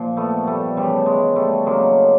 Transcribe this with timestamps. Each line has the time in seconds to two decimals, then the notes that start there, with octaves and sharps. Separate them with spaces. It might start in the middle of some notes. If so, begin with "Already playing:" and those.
Already playing: A#2 F3
0.17 A3 B3
0.47 G3 A3
0.76 C#3 E3 G3
1.06 G#3
1.36 G3 A3
1.66 C#3 F#3 G#3 A#3